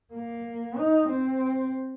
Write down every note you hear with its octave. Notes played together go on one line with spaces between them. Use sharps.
A#3
D#4
C4